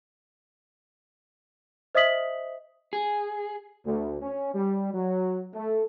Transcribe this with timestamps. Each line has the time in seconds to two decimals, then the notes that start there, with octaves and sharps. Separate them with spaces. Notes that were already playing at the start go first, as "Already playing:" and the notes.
1.95 C5 D#5 E5 D#6 B6 F#7
2.93 G#4
3.86 D2
4.21 C#4
4.54 G3
4.93 F#3
5.54 A3